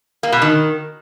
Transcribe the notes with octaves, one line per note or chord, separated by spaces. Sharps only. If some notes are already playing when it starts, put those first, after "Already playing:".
A#3
B2
D#3